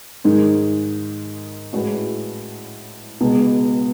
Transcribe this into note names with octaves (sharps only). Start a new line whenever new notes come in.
G#2 D#3 G#3 D#4
A2 G#3 C#4 F#4 B4
C#2 B2 G#3 B3